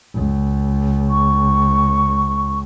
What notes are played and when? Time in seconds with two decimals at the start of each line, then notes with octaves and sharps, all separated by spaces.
0.14 C#2
1.11 C#6